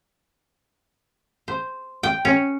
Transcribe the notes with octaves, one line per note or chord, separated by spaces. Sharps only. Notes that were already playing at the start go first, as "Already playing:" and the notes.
C5
G5
C#4